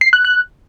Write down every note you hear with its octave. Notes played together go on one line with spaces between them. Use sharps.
C7
F#6
F#6